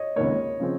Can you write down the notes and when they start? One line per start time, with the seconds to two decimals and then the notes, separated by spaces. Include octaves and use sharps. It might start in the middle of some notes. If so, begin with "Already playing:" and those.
Already playing: C#5 D#5
0.16 C#2 C3 D#3 A#3 C#5
0.60 C#3 F3 C4